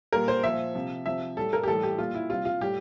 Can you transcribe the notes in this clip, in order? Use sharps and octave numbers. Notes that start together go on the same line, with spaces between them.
A#2 G3 A#4
C5
A#2 F3 E5
C3 F3
C3 F3 E5
A2 G3 A4
A#4
G4
A2 E3 G3 A4
G4
A#2 G3 F4
E4
C3 G3 F4
F4
A2 G3 G4